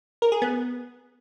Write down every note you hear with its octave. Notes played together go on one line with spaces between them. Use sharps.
A#4
G#4
B3